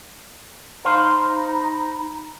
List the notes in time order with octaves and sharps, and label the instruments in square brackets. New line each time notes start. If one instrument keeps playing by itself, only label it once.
[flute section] D#4 A#5 B5 [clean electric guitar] C5 F5